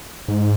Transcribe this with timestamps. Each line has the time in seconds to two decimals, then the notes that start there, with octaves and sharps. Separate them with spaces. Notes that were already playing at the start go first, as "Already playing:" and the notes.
0.28 G#2